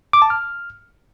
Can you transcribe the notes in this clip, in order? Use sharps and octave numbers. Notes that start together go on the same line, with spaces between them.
D6
A5
F6